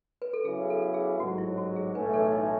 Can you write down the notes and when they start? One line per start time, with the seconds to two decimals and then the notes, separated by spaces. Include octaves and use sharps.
0.22 B4
0.33 A4
0.45 C#3 F#3 B3 E4 G#4
0.70 A4
0.94 G#4
1.20 A1 G#2 F#3 F#4
1.38 E4
1.57 F#4
1.76 G#4
1.94 B1 A2 E3 A3 C#4 B4
2.13 A4 C#5
2.32 D#4